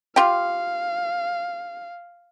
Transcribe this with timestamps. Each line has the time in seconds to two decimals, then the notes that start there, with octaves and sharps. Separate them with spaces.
0.16 F4 G4 F5